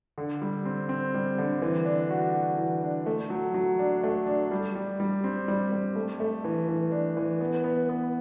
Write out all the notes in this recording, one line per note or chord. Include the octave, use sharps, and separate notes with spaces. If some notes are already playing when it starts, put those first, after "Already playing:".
D3
G3
C4
C4
G3
D3
E3
D4
F#4
F#4
E3
D4
A3
F#3
F#3
D4
A3
D4
G3
G3
G3
C4
G3
G3
A3
A3
E3
E3
D4
E3
B3
B3
B3